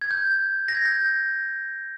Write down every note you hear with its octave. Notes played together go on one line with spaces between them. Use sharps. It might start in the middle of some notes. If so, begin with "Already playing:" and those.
G#6
G6
A#6
G#6
G6